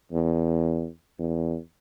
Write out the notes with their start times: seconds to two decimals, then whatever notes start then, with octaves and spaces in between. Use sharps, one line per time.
0.12 E2
1.19 E2